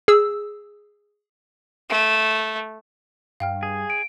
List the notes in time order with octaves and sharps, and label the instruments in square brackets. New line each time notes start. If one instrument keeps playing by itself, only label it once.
[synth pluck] G#4 E6
[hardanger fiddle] A3
[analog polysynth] G2 [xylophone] F5 G5 F6
[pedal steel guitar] G#4
[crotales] D7